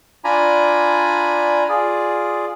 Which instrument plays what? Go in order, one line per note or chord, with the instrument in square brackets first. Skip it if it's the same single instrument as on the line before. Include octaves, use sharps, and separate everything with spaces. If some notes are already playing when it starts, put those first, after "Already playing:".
[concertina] D4 F4 D5 G#5 A#5 B5
F4 G#4 D5